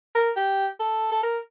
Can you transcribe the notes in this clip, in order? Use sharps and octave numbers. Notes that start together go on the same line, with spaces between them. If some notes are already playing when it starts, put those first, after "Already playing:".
A#4
G4
A4
A4
A#4